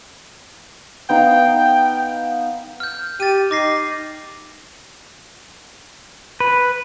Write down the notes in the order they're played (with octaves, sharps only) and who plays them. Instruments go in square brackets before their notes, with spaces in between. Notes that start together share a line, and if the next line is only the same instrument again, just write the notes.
[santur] B3 D#4 F5 [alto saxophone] G5
[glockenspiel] F6 G6
[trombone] G4 [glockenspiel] A6 D#7
[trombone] D#4 [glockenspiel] D6 A#6 C7
[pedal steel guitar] B4